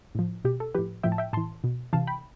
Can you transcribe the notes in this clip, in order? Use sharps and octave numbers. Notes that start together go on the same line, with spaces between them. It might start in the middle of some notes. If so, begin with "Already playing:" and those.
A2 F3
B2 G4
A4
A2 F3 G4 B4
A2 F3 E5 G5
A5
E5 G5
A2 E3 A5 C6
B2
C3 E3 F5 A5
G5 B5